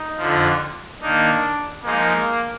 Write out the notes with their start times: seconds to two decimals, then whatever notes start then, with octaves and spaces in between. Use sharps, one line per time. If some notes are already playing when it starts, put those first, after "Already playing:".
Already playing: D#4
0.18 F2 D3 F3
1.01 D#3 A#3 D4 D#4
1.84 F3 G#3 A#3 D#4